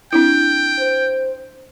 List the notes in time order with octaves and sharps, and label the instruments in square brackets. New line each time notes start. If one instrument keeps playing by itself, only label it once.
[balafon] C4 D4 E4 [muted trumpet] G5
[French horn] C5